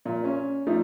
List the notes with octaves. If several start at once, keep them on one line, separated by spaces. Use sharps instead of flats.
A#2
C#4
F3 A3 D4 D#4